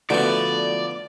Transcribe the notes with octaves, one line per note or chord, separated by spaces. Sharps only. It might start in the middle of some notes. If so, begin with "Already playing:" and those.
D3 F3 A3 B3 E4 F#4 B4 D5